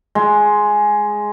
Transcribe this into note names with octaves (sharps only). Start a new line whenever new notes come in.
G#3